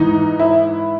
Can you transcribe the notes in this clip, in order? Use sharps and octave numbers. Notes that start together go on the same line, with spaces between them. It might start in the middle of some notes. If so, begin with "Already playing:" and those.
Already playing: G#2 E3 D#4
E4